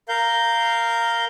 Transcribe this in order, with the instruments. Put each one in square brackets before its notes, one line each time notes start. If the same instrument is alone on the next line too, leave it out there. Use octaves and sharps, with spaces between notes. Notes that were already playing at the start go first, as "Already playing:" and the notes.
[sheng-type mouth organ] A#4 F5 G6